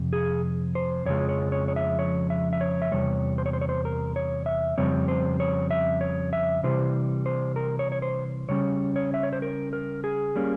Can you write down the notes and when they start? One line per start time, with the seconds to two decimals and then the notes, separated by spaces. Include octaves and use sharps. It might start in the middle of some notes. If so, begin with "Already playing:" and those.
Already playing: F2 C3
0.13 G#4
0.75 C5
1.05 F2 C#3 F3 G#3 C#5
1.29 C#5
1.52 C#5
1.68 C#5
1.76 E5
1.99 C#5
2.30 E5
2.53 E5
2.61 C#5
2.82 E5
2.91 E2 C3 G3 C#5
3.38 C5
3.46 C#5
3.53 C5
3.61 C#5
3.69 C5
3.85 A#4
4.16 C#5
4.46 E5
4.78 F2 C#3 G3 C4 C#5
5.08 C5
5.40 C#5
5.71 E5
6.01 C#5
6.33 E5
6.63 C3 E3 G3 C5
7.26 C5
7.56 A#4
7.79 C#5
7.92 C#5
8.02 C5
8.49 C#3 G3 C#4 C#5
8.96 C#5
9.14 E5
9.23 C#5
9.33 C5
9.42 A#4
9.73 A#4
10.04 G#4
10.36 G3 A#3 C#4